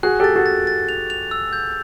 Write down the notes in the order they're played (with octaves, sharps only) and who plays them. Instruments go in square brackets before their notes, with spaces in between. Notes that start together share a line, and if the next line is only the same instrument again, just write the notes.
[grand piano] F#4 G#4 [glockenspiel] F#6
[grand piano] G4 A4 [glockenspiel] A6
[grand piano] F#4 G#4
[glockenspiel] A6
A6
F7
F7
E6
G6